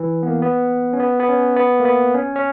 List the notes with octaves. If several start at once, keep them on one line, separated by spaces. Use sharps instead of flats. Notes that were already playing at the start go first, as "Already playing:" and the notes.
Already playing: E3
B3
A#3
B3
C#4
B3
B3
C#4
B3
A#3
B3
C#4
C#4